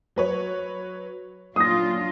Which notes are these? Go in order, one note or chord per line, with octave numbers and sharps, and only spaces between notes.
F#3 B4 C#5
A#2 F#3 D4 F4 D#6 A#6